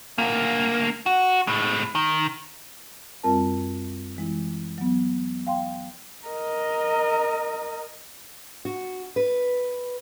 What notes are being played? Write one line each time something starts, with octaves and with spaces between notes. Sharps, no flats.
D2 A#3
F#4
A2 G#3
D#3
F#2 G3 C4 F4 A#4 A5
E3 G#3 E4
F#3 B3
F5 G5 C6
A#4 D#5
F#4
B4